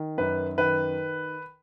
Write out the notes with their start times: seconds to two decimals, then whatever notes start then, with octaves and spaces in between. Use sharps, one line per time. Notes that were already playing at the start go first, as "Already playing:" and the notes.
Already playing: D#3
0.18 F#2 B4
0.58 D#3 B4